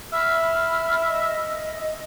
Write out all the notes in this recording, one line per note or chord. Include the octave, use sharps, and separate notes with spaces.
E5 B5 F6
D#5